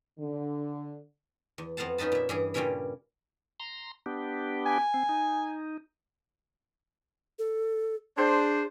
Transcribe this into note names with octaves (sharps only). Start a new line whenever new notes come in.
D3
E2
F2 B3 F5 F#5 A5
B3 C#4 D#4 B4 A5
A#2 E5
G2 E3 G#4
G2 A#2 C#3 G3 C#4 E4
A#5 C6
B3 D4 G4
G#5
C4
D#4
A4
D4 G#4 C5